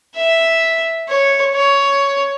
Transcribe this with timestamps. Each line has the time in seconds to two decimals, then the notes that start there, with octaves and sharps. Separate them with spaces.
0.17 E5
1.09 C#5
1.55 C#5